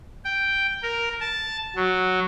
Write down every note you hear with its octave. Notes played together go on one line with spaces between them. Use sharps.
G5
A#4
A5
F#3